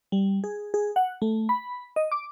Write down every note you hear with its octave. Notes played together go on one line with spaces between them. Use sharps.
G3
G#4
G#4
F#5
A3
B5
D#5
D6